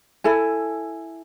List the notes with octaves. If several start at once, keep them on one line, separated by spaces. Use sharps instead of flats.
E4 A4 G#5